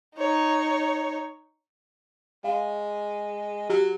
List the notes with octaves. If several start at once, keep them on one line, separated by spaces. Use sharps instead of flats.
D#4 C#5
G#3 F5
F#3 G4